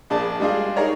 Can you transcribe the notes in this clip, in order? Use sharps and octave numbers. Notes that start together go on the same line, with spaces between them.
A#1 D4 G#4 A5
G3 G#3 D4 F4 G#4
D#4 G#4 A#4 C#5 A#5